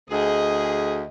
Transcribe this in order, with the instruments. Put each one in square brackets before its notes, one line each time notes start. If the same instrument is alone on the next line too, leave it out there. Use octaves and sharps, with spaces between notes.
[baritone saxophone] D2 [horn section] G#4 [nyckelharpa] D#5